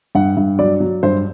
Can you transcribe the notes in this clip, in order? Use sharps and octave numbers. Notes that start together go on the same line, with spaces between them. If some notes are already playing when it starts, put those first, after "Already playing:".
G2 F#5
G2
F#3 D5
F#3
G2 C5